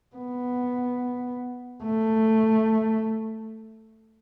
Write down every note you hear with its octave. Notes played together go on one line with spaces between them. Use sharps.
B3
A3